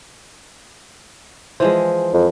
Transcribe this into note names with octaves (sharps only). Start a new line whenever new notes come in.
E3 F3 G#3 C5
F2